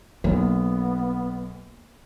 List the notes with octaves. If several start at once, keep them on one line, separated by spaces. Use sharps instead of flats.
B1 A#3 B3